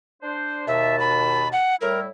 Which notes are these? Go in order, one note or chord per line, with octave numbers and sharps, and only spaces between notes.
D4 C5
D#2 B2 E5 A5
B5
F#5
A2 G3 E4 A#4